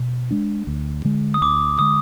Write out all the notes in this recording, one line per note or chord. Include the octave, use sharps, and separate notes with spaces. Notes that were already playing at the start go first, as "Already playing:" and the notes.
Already playing: B2
G#3 D4
D2
D3 G#3
D#6
D2 D6
D3 G#3 D#6